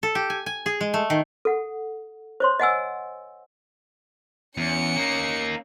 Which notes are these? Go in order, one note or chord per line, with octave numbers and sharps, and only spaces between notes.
A4
G4
G#5
G#5
G#4
G#3
A3
D#3
A4 F#5
C5 C#5 C6
D#5 F#5 G#5 E6
E2 C#4 C#7
A#3 D#4